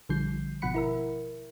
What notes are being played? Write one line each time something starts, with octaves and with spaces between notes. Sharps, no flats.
A#1 D3 F3 G3 G6 C7
G#1 B2 F3 F#5 B5 C#7
E4 A#4 E5